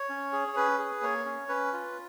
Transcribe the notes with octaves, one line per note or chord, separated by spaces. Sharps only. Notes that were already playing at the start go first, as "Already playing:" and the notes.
Already playing: C#5
C#4
G#4
C#5
C#4 B4
G#4
A#3 C#5
C#4
C#4 B4
F4